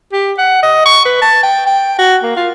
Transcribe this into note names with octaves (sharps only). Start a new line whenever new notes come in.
G4
F#5
D#5
C#6
B4
A5
G5
G5
F#4
A#3
F4